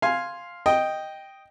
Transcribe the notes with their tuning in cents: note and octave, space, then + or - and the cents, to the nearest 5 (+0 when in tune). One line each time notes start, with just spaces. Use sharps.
F5 +0 G#5 +0 C6 +0
D#5 +0 G5 +0